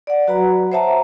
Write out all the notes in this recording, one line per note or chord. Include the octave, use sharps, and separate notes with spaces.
D5 F#5
F#3 F#4 B4 F#5 A#5 B5
C5 C#5 E5 F#5 A5 A#5